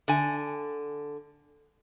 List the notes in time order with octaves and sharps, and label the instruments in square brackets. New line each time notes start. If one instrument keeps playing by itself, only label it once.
[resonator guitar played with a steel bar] D3 G#5